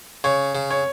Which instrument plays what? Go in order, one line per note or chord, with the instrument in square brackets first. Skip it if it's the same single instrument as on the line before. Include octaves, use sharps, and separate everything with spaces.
[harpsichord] C#3 [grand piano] C#5
[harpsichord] C#3
[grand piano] C#5